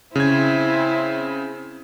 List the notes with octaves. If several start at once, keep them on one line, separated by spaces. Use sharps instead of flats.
C#3 C4 E4 G#6